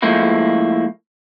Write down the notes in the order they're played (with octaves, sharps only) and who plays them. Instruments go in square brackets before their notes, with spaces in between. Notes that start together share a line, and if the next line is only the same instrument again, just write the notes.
[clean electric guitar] A2 F3 G#3 A#3 E4